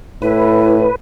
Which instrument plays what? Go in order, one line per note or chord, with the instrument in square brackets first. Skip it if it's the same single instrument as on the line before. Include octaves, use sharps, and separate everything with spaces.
[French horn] A2 [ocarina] E4 [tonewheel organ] B4